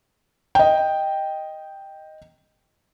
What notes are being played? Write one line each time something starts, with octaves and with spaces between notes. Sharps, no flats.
D#5 G5